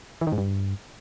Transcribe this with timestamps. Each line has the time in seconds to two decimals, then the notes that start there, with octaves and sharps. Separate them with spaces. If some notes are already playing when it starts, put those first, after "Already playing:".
0.21 E3
0.27 D#3
0.32 G#2
0.38 G2